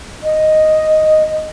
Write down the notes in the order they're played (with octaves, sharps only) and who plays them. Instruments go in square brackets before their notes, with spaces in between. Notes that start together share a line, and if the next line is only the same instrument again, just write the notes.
[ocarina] D#5